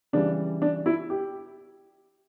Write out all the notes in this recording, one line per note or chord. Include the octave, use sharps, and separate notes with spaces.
C#3 E3 G3 D4
D4
E4
G4